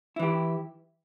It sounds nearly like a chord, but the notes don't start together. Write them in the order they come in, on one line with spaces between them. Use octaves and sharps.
E4 E3 G4